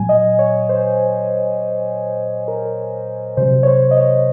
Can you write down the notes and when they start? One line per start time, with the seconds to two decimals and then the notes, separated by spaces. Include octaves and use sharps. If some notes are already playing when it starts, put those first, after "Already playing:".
Already playing: A#2 F#3 G#5
0.09 D#5
0.39 C#5
0.69 C5
2.48 A#4
3.37 C3 F#3 C5
3.63 C#5
3.67 C5
3.91 D#5
3.97 C#5